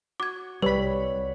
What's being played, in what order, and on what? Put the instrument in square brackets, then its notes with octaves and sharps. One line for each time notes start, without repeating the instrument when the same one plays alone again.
[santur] F#4 [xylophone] D6 G#6
[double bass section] C2 [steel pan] G3 B5 [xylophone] B4 [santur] C#5